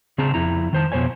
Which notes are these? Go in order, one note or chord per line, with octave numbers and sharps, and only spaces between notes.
C#3 C4 G#4 A5 A#5
F2 E4 A#5
D#3 C5 A5
F2 B2 C5 C#5 G#5